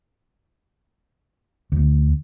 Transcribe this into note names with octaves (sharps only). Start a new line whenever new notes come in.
D2